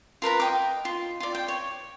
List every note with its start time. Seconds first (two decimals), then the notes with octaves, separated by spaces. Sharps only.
0.22 F4 A#4 B4 A#5
0.40 D#5 G5 D6
0.85 F4
1.20 F4 D5
1.35 G5
1.48 C#5